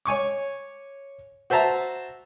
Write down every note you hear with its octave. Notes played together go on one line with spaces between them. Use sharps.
C#5 G#5 C#6 D6
F#4 C5 E5 A5 A#5